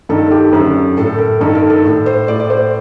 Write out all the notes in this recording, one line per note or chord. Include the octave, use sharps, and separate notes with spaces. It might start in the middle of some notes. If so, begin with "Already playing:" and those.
G2 D#3 A4
G4
F#2 D3
A2 A4
A#4
G2 D#3 A4
A#4
A4
A2
C5
A2 D5
D5
C5